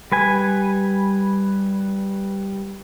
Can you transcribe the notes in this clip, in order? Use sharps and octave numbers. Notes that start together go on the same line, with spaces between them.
G3 B4 G#5